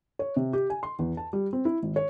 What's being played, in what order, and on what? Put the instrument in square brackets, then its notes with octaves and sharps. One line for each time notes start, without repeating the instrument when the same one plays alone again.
[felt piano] C#5
C3
G4
G#5
C6
E2
A5
G3
C4
E4
G#1
C#5